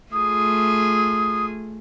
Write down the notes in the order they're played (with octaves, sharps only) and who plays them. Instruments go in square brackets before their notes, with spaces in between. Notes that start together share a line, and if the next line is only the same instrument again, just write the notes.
[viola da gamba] A3 F4 G#4 [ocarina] D#6